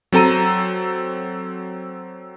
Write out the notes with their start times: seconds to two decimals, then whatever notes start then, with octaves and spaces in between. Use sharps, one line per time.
0.12 F#3 C4 A4 A#5 D#7